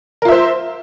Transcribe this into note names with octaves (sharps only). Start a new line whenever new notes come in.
F4 A#4 C5 E5